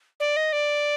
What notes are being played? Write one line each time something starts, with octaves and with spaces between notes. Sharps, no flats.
D5
D#5
D5